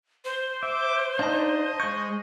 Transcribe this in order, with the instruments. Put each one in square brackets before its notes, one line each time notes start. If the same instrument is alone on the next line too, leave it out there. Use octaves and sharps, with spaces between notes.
[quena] C5
[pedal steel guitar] E5 [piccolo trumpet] D6
[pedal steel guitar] D4 D#4 [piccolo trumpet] D#5 [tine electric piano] F5 A5
[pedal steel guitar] G#3 G6 [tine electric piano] C#6